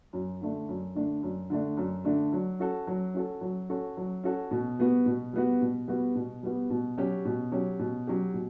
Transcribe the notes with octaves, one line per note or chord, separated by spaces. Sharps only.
F#2
D3 A3 D4
F#2
D3 A3 D4
F#2
D3 A3 D4
F#2
D3 A3 D4
F#3
C#4 F#4 A4
F#3
C#4 F#4 A4
F#3
C#4 F#4 A4
F#3
C#4 F#4 A4
B2
G3 B3 F#4
B2
G3 B3 F#4
B2
G3 B3 F#4
B2
G3 B3 F#4
B2
F#3 C#4 G4
B2
F#3 C#4 G4
B2
F#3 C#4 G4
B2